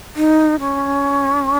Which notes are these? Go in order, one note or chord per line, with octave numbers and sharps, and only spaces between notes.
D#4
C#4